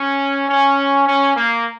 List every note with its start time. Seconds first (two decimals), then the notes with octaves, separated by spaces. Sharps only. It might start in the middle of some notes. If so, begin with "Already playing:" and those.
Already playing: C#4
0.48 C#4
1.07 C#4
1.36 A#3